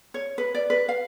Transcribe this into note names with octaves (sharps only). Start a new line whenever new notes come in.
C#5
B4
D5
B4
F5